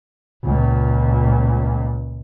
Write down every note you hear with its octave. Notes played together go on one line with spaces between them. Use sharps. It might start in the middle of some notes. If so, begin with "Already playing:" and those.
C#2 A#2